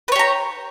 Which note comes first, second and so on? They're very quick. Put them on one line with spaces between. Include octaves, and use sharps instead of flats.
B4 C#5 G4 A#5